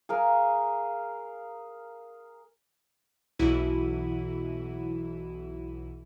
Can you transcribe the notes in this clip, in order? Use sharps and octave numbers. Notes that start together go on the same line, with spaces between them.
G#4 A#4 F5
B1 B2 E3 E4 F#4 D#7